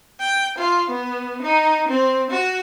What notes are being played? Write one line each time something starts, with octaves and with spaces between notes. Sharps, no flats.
G5
F4
B3
D#4
C4
F#4